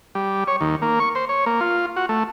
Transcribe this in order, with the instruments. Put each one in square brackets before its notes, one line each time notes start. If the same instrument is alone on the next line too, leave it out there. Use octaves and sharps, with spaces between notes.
[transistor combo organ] G3
C#5
D#2
A#3
C#6
C5
C#5
A#3
F4
F#4
A3